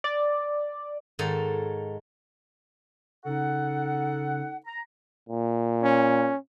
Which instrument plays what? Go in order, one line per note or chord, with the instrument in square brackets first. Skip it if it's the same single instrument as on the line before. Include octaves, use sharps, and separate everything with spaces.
[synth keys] D5
[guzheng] G#2 D#3 D#4 A4 C#5
[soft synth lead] C#3 [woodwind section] D#4 A4 F#5
[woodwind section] A#5
[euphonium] A#2
[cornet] C#4